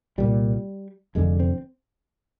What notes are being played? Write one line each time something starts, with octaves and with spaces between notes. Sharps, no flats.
C2 A#2 G3
F1 F2 D3 G#3
C4